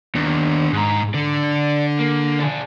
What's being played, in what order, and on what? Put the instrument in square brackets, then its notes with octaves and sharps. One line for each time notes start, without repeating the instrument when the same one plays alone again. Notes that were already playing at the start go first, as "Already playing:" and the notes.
[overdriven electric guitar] D#2 [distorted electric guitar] B3 D4
[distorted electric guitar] G#2 [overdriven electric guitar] G#3 A#5
[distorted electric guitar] D3 [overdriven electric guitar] D5
[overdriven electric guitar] A#3
D4 G#4